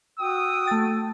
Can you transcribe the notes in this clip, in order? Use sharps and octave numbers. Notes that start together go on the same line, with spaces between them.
F#4 G5 D#6 E6
A3 A6